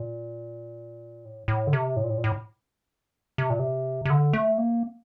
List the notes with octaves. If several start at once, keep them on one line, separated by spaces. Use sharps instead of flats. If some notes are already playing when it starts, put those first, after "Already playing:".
Already playing: A#2
A2
A2
D3
C3
A2
A#2
A2
A#2
A2
C3
A#2
C3
C3
D3
A3
A#3